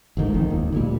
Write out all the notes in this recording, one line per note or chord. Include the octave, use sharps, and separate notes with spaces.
A1 D2 G#2 D#3
F1 C2 F2 D#3
D#2
D2 A#2 G3